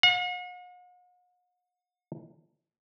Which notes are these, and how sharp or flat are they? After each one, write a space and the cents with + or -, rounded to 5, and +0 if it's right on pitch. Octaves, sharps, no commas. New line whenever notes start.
F#5 -45